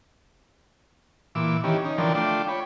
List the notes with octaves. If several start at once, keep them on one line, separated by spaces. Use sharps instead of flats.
A#2 E3 D6 E6
D#3 E3 C#4 G4
C#4 D#4
D3 E3 F3 A#4 D5 G5
A3 D4 F4 G5 D6
C#5 G5 B5